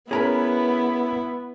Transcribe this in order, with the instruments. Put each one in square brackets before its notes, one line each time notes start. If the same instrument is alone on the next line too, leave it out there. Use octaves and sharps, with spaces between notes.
[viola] B3 [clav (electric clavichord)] C#4 A#4 B4 [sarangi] E4 [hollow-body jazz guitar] G#4 A#5 B5